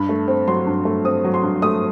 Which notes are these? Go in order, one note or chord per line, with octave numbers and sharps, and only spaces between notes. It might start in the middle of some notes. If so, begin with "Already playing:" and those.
Already playing: G2 B5
A3
C4
F#3 C6
G2
A3
C4 D#6
F#3
C6
G2
A3 D#6